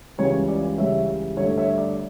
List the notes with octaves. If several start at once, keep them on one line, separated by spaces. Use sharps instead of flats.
C#2 C#3 E3 G3 C#5
D5
C#2 C#3 E3 G3 C#5 E5
G2 D3 A3 C#5 E5
C#5 E5
D5